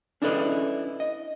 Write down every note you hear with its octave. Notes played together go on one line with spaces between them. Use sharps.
C#4 D4 E4 A4 B4 D#5
D#5